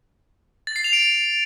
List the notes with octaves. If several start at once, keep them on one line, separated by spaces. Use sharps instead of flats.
A6
C7
F7
D7